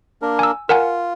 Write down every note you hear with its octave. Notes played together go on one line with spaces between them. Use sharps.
A#3 D4 A#4
G#5 E6
F4 A#4 F#5 G#5